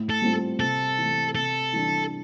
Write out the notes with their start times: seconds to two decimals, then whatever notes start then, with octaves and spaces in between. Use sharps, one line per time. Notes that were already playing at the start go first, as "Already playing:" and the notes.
Already playing: A2
0.10 A4
0.22 G3 C4 F4
0.60 C3 A4
0.98 E3 A3
1.35 C3 A4
1.73 E3 G3 D4